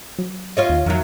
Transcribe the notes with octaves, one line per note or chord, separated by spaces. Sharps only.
F#3
F4 C#5 D#5
D#2
F2 D#3 F#3